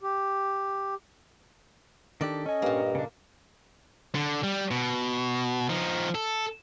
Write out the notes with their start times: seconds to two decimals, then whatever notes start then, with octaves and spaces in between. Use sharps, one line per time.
0.02 G4
2.21 D#3 D4 G4 A4
2.46 C#4 D#5 G#5
2.62 G2 A#2 A#3
2.95 C#3 D4
4.15 D3
4.43 G3
4.71 B2
5.70 F3 D#4
6.15 A4